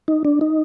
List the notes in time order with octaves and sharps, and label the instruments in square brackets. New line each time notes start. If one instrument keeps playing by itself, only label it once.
[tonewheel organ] D#4
D4
D#4